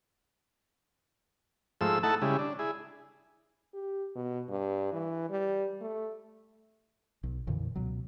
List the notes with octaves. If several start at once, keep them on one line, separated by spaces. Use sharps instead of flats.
G#2 F3 A3 E6
A3 D#4 E4 A4 F#5 A5
C#3 G3 G#3 E4
D4
E4 G#4
G4
B2
G2
E3
G3
A3
B1
F2 A#2 D3 E3
C#2 B2 F#3